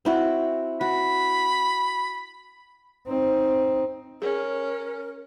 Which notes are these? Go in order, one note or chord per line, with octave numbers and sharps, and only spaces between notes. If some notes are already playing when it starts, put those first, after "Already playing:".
C4 E4 F#4
F#4 B5
C4 D#4
C#4 G#4 A#4